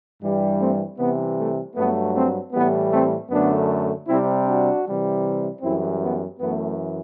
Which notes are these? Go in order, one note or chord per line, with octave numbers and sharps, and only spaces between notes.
G2 E3 G3
A3 C4
C3 E3 G3 B3
A3
G2 F#3 A3 B3
A3 C4
A2 E3 G3 B3
A3 C4
F#2 D3 A3 B3 D4
C3 G3 C4 E4
D4 F#4
C3 E3 G3
F#2 E3 G3 C4 E4
B3
F#2 E3 A3 B3